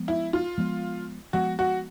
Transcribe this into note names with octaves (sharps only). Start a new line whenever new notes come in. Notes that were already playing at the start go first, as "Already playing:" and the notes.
Already playing: F3 G#3 B3
E4
F4
F3 G#3 B3
F3 G#3 B3 F#4
F#4